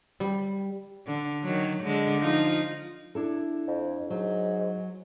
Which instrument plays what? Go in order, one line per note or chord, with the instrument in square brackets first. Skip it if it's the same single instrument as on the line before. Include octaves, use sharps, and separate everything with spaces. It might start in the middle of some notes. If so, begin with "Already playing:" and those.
[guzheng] G3
[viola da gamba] D3
D#3 F#3
D3 G#3
F3 D#4 F4
[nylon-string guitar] D4 E4 A4
[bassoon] F2
[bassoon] G#2 [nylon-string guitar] F#3